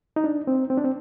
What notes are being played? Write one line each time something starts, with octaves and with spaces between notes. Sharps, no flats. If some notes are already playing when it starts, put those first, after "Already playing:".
D#4
D4
C4
C4
D4
C4